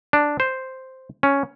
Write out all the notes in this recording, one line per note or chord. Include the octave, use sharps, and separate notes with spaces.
D4
C5
C#4